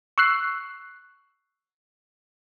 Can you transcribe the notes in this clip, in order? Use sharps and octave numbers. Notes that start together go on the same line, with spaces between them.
C#6 E6 F#6 C7